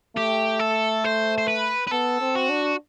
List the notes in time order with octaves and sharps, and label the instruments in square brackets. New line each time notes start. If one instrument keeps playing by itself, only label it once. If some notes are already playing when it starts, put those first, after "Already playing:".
[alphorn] A3 [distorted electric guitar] G4
[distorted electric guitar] A4
C5
C5
B4
B4
[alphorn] B3 [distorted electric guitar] A4
[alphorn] C4
[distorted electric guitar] F#4
[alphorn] D4